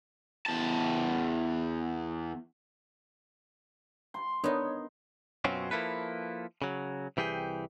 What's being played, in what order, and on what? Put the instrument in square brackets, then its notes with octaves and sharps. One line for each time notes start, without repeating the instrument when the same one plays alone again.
[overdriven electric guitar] E2 A5
[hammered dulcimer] C6
[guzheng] B3 D#4 [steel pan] D4 A#4 [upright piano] C#5
[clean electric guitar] F#2 B2 F#3 C4 C#4 F4
F3 A#3 E4 A4 B4
C#3 F#3
C2 E3 G4 G#4 G5